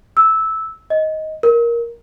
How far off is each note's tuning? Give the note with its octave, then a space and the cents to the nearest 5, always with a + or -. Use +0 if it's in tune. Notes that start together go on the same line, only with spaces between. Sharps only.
E6 -10
D#5 +10
A#4 +10